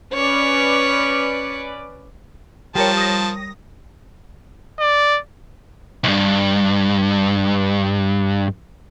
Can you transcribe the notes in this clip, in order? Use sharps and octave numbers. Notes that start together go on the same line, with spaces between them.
C#4 B4 C#5 D5
F3 G3 A#4 C#5 A5
D#6 A#6
D5
B1 G2